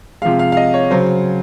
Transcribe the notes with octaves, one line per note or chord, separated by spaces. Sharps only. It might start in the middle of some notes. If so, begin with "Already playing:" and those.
C3 F3 G#3 F5
F5
F5
D#5
C#5
C#3 F#3 C5